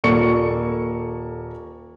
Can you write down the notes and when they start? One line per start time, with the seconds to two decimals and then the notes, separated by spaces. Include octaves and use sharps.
0.04 D#1 A#3 A4 D5 C#6 C#7